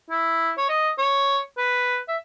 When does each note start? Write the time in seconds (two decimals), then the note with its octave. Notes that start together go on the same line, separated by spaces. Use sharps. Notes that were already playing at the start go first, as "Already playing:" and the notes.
0.10 E4
0.57 C#5
0.69 D#5
0.98 C#5
1.57 B4
2.08 E5